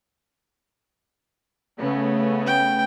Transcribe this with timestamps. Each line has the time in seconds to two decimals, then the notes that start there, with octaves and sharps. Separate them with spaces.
1.81 C#3 A3 B3
2.47 G5